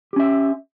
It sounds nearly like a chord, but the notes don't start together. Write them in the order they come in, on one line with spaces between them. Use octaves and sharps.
G4 C#4 E5